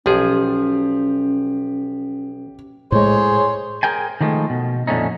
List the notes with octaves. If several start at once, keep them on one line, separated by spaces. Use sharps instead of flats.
B1 F3 C#4 G4 G#4
A2 G#3 G#4 C5 C#5
G#4 A#4 G5 G#5
D#3 F3 G#3 A3
B2
F2 A#2 D3 A3 C#4 D#4